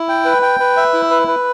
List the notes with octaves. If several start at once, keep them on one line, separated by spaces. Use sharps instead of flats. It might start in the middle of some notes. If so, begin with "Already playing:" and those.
Already playing: E4
G5
B4
G5
B4
E5
E4
B4
B4